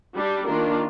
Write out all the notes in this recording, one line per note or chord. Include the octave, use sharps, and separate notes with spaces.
G3 D4 G4
D#3 A#3 D4 F4 A#4